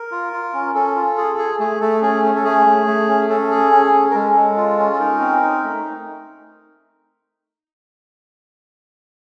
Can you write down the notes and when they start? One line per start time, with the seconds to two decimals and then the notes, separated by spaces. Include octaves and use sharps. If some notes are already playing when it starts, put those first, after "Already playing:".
Already playing: A#4
0.11 F4
0.33 F4
0.54 C#4
0.74 C#4 A4
0.96 F4
1.18 G#4
1.38 G#4
1.59 A3 G#4
1.81 A3 A4
2.02 C#4 G#4
2.23 C#4
2.36 A4
2.44 A3 G#4
2.66 A3
2.87 A3
3.09 C#4
3.29 C#4 A4
3.51 G#4
3.72 C#4
3.93 C#4
4.11 A#4
4.14 G#3 A4
4.35 G#3
4.57 F4
4.78 C#4
4.93 A4
4.99 D#4 A#4
5.20 C4
5.42 D#4
5.63 A3